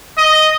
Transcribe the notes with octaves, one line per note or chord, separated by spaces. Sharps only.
D#5